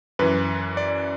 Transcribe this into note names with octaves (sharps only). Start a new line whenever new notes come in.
F#2 E3 B4
D5